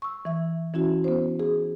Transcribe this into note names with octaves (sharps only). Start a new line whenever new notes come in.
C#6 E6
E3 E5
E3 C#4 E4 F#4
B3 C5
G#4